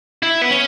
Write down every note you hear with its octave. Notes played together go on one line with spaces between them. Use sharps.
E4
B3
C#4